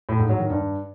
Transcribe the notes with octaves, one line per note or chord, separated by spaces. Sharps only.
A2
G#2
F#3
D#3
G2